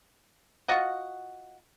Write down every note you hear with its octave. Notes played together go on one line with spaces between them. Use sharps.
F4 F#4 D#5 F#5